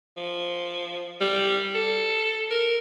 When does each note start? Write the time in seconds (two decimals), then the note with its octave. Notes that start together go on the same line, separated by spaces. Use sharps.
0.17 F3
1.21 G3
1.74 A4
2.50 A#4